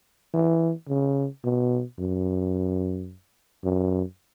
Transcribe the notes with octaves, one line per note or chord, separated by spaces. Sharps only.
E3
C#3
B2
F#2
F#2